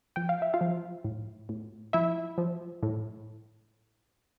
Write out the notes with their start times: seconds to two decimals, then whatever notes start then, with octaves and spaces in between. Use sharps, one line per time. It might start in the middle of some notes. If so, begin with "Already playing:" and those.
0.16 F3 G5
0.29 F5
0.42 E5
0.54 F4 F5
0.61 F3
1.04 A2
1.49 A2
1.93 F3 E4 E5
2.38 F3
2.83 A2